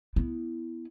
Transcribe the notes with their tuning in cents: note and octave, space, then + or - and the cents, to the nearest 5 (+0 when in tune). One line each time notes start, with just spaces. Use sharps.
B3 +0 E4 +0